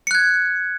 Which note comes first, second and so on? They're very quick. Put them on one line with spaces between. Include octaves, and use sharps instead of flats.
C#7 F#6 G#6